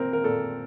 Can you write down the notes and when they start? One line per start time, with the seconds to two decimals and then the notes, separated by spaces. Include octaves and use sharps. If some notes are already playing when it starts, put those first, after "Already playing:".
Already playing: A#2 C4 A#4
0.13 A#4
0.24 A#2 A4